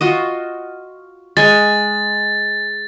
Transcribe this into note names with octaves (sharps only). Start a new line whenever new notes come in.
F4 F#4 D#5
G#3 G#5 A6